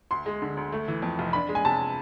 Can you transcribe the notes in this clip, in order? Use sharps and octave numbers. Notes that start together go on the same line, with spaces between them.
D2 C6
G#3
D3
D2
A3
E3
F2
F1
D4 B5
G#3
G#5
C3 A5